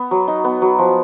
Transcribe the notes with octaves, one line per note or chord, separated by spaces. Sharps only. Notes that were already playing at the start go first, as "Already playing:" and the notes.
Already playing: B3
F#3
D#4
B3
F#3
F3